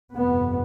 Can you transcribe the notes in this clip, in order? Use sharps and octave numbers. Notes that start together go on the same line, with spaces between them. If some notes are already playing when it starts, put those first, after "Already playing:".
G1 F2 C3 B3